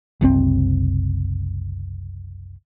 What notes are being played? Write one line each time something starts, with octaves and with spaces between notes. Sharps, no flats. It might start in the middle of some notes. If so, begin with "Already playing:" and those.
F#1 C2 A#2 C4